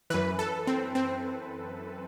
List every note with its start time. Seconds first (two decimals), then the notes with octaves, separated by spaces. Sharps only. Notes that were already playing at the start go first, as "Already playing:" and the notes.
0.10 F#2 E3 B4
0.39 A4
0.67 C4
0.95 C4